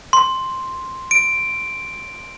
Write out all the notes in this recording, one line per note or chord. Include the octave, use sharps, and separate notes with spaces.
C6
D7